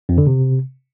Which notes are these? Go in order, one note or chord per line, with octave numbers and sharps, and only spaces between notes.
F2
D3
C3